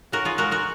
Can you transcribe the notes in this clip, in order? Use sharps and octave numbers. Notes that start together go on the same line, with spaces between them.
C#3 F#4 A#4
F4 G#4
G#3 F#4 A#4
F#4 A#4